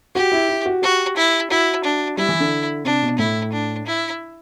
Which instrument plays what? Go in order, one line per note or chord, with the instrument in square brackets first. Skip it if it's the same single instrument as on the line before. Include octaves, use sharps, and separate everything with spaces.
[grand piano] F#4 [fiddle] G4
[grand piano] E4
E4
F#4
[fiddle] F#4 [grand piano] G4
[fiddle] E4
[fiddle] E4 [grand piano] F#4
[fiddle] D4
[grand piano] G3 [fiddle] E4
[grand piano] E3
D3
[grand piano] C3 [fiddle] D4
[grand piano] B2
[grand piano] A2 [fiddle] E4
[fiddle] D4
E4